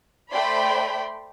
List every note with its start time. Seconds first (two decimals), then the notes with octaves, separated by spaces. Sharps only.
0.33 A3 C5 D5 G5 B5 C6